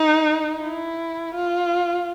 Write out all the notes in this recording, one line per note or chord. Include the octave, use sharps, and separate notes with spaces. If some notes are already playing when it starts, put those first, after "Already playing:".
Already playing: D#4
E4
F4